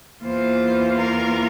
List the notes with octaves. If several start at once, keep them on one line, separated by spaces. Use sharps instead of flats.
E2 E3 A#3 F4 C5
A#4